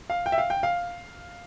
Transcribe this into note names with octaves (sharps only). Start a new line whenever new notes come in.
F5
G5
E5
F5
G5
F5